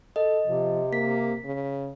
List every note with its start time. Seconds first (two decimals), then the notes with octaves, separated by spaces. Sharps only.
0.16 A4 D#5
0.47 C3 F3
0.93 A#3 B6
1.45 C#3